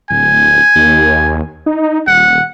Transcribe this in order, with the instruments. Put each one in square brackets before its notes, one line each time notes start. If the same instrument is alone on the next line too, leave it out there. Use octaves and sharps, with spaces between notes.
[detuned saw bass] D1 [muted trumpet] G#5
[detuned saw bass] D#2
D#4
[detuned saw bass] D#1 [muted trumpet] F#5